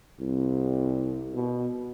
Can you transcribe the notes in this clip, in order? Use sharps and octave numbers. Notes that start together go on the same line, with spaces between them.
C2
B2